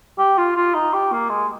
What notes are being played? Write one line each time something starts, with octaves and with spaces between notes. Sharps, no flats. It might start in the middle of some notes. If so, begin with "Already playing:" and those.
G4
F4
F4
D#4
G4
A#3
G#3